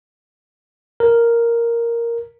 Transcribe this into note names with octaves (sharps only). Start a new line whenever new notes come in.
A#4